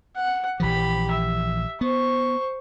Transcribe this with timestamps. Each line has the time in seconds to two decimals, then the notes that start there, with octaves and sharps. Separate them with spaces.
0.16 F#5
0.60 A#1 E3 F3 G4 B5
1.11 E5
1.81 B3 C5 C#6